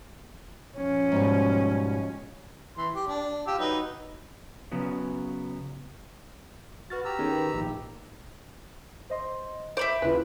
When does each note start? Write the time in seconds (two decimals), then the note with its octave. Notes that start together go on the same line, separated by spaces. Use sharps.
0.77 F3 C#4
1.12 G#2 B2 G3
2.77 E3 C6
2.94 G4
3.07 D4
3.47 F4 G4 E6
3.59 F#3 D#4 B4
4.72 C#3 F#3 B3
6.90 F#4 B4 F6 A6
7.05 G4 A#5 E6
7.19 D#3 B3 C#4 G#4
7.32 B4
7.54 A#1 A2 D#4
9.10 C5 D#5 C6
9.77 C5 E5 B5 D6 G6
10.02 D#2 C#3 E4 F4 B4